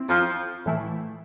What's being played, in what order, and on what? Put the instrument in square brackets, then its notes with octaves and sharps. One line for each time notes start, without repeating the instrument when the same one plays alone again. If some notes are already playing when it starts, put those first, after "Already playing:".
Already playing: [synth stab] C4 E4
[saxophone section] F2 F3
[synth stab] A2 E3 A3 E4